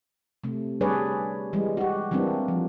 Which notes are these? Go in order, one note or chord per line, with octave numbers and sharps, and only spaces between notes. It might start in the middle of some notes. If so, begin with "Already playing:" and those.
C3 A3
G3 D4 G#4 B4 C#5 D5
E3 G3 G#3
F#4 G4
E3 G3 A#3 C4 D4
F3